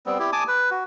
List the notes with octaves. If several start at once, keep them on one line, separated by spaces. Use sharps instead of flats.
G3 B3 C4
E4 G4
G#5 A5 D6 D#6
B4
F#4